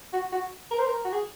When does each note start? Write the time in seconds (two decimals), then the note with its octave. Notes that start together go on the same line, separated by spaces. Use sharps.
0.13 F#4
0.32 F#4
0.71 A#4
0.79 C5
0.86 A#4
1.05 F#4
1.13 G#4